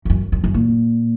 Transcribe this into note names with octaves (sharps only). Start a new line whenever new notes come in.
F2
F#2
F#2
F#2
A#2